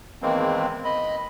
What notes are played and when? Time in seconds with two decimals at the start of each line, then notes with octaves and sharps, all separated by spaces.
0.22 E2 D#3 E3 G#3 A#3 C4
0.85 D#5 B5